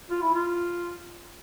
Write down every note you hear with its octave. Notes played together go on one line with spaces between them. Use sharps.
F4
E4
F4